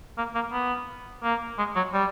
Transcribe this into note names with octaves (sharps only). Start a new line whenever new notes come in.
A#3
A#3
B3
A#3
G#3
F#3
G3